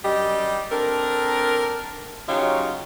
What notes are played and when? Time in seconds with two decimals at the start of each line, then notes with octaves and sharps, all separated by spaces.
0.03 F#2 G3 G4 D#5
0.71 C4 D4 A4 A#4
2.28 C#3 F#3 D#4 F4 G4 C#5